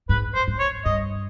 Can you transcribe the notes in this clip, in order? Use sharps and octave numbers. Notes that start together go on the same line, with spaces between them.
G#2 B4
C5
G#2
C#5
G2 D#5